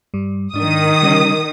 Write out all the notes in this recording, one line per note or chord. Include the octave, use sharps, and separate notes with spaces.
G2 G3
G#2 D#3 D4 D#6
C#3 G3 C#4